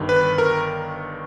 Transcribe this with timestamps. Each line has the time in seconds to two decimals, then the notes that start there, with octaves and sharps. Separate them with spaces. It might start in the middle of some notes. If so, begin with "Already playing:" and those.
Already playing: G1 G2 D#3
0.09 B4 B5
0.38 A#4 A#5